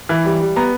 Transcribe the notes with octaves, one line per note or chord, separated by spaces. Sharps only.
E3
G3
G3
B3 A#5